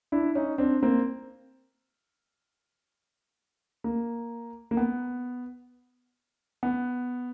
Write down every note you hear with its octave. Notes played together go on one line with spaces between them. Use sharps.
D4 E4
C#4 D#4
C4 D4
A#3 C4
A#3
A#3
B3
B3